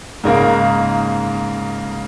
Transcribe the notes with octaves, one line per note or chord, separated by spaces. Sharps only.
G#2 C#3 A#3